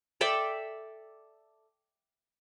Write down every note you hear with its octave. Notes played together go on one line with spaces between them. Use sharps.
A4 D5 E5 G5